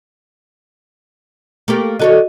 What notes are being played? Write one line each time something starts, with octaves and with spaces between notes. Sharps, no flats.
A3 A#3 G4
D3 F#4 A4 C#5 D#5